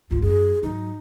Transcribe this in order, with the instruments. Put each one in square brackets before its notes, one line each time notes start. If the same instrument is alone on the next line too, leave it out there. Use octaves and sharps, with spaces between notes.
[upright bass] D2 G#2 [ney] F4
[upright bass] F#2 [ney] G#4
[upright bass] G#2 F#3 [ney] D#4